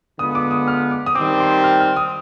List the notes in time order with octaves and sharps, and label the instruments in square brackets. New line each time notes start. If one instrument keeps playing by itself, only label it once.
[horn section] D3 G#3 B3 F4 [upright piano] D#6
[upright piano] D6
D#6
F6
D6
D#6
[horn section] D#3 G3 C4 [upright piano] D6
[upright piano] C6
F6
F6
D#6